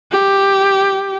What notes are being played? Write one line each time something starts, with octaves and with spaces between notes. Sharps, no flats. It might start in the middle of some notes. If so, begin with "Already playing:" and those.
G4